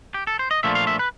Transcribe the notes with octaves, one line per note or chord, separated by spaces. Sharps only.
G4
A4
C5
D#5
A#2 F3 A3 D4 F4 E5
F5
E5
B4